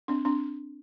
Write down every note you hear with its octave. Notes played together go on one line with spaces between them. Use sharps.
C4 D4
C4 D4